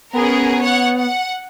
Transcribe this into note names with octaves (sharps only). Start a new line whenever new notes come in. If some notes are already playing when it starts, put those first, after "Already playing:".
B3 C#4 G#4 A#4
C#5 F#5
F#5